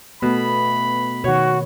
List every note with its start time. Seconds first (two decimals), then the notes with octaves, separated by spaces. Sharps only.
0.22 B2 A3 B3 B5
1.24 B2 D#3 F#4 C#5